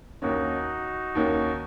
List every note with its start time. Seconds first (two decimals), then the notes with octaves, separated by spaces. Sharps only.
0.22 D#2 D#3 A#3 C#4 D#4 F#4
1.15 D#2 D#3 A#3 C#4